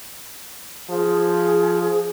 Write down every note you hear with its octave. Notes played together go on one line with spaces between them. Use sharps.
F3 G#4